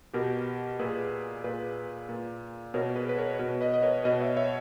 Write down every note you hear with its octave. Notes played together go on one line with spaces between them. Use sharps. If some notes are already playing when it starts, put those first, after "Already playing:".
B2 G4 A#4
A#2 G#4 B4
A#2 G#4 B4
A#2
B2 A#4 C#5
G#4 B4
B4
A#4 C#5
B2
B4 D#5
D#5
A#4 C#5
B2 B4 D#5
C#5 E5
C#5 E5